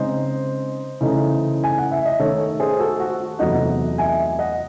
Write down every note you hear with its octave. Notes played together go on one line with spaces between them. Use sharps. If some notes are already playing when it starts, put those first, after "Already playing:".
Already playing: C#3 G#3 C4 D#4 C5 D#5
C#3 E3 A3 D#4
G#5
F#5
E5
D#5
D#3 A3 D#4 A4 C#5
G#4 C5
F#4 A4
F#4
E2 C3 F#3 A3 D#4 D#5 F#5
E5 G#5
D#5 F#5